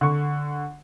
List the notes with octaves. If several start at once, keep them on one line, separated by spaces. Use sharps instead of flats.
D3 C#6